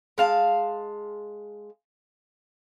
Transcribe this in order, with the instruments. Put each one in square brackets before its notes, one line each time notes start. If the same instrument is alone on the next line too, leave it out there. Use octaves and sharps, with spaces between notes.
[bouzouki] G#3 F5 A5